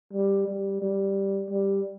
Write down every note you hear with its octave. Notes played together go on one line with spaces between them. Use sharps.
G3
G3
G3
G3